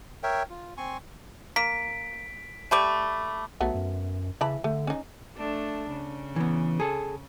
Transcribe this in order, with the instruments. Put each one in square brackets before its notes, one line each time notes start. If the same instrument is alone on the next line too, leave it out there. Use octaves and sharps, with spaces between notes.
[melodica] A#4 C#5 E5 G5
F4
C4 G#5 C6 C#6
[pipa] A#3 [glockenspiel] B6 D7
[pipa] A3 G4 D5 [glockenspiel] A5 B5 D6
[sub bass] B1 [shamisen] F#3 A3 B3
[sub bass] F#2
[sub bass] C#3 [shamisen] E3 A5 B5
[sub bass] D3 [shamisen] A3
[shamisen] C#4 D#4
[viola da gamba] A3 D4
C#3
[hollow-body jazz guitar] E3 B3
G#4 A4